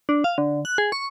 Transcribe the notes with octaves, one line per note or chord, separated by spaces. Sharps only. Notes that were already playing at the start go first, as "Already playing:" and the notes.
D4
F5
D3
F#6
G#4
C#6